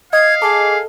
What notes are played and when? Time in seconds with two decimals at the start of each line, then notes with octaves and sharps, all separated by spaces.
0.13 D#5 F5 G#6
0.42 G#4 A4 D6